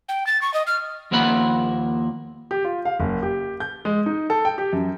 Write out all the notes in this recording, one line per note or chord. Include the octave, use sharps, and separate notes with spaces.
G5
A6
C#6
D#5
F6
D#2 F3 A#3 E5 F#5 B5
G4
F4
F5
F#1
G4
G6
G#3
D#4
A4
G5
G4
F#2